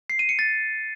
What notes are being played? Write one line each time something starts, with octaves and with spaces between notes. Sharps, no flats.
C7
D#7
C#7
A6